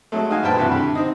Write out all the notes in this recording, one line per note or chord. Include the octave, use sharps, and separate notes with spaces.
F#3 G#3 A3
D#4 F#4 F5 G#5
G2 A#2 B4 C5 G5 A5
G2 C3 E3 F#4
G2 D3
C4 D#4